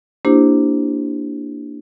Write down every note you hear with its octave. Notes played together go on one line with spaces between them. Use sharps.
A#3 D4 E4 G4 C5